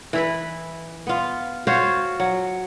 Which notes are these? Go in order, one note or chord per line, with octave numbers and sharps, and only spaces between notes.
E3 E4 B4
B3 F4
F4 F#4 C5 C#5
F#3